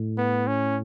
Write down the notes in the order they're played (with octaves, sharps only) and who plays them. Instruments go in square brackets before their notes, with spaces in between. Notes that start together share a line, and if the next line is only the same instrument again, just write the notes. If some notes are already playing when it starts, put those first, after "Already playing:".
Already playing: [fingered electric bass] A2
[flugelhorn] B3
C#4